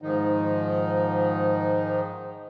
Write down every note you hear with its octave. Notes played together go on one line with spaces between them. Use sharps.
G#2 D#3 F3 D#4